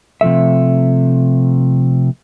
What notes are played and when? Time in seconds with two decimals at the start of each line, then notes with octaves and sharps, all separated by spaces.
0.21 C3 F3 A3 E5